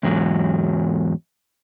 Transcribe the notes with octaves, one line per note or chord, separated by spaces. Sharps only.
E2 G#2 F#3